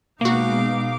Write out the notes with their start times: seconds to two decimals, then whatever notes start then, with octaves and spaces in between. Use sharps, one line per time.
0.21 B2 G#3 A#3 B3 D#4 F#4 F5 D6